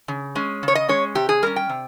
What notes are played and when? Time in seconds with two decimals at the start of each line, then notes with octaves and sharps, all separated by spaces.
0.08 C#3
0.35 G#3 C#4
0.63 C#3
0.68 C#5
0.75 D#5
0.89 G#3 C#4 C#5
1.15 C3 G4
1.29 G#4
1.42 G3 C#4 A#4
1.56 G5
1.69 C3